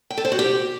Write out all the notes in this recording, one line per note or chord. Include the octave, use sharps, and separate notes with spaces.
G5
A4
C5
F#4
G4